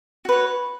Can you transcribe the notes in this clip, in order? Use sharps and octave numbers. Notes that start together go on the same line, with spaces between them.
F#4 B4 C#5